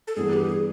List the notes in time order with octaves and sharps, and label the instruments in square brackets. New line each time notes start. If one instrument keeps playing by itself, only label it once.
[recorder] A4
[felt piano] G2 E3 G3 B3 [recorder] G#4
[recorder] G4
G#4